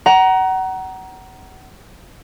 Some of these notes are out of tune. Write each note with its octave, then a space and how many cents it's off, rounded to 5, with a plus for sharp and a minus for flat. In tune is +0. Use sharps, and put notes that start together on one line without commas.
F#5 +30 A#5 +15